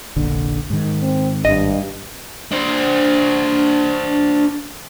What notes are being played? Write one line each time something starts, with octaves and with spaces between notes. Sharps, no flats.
F1 A#1 D3
G#2 D#3
C4
G#1 G2 D#5
D4 C5